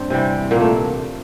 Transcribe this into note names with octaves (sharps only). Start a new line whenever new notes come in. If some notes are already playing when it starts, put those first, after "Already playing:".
Already playing: G2 C4 D4
C3 E3 G3
A#2 A#3
A3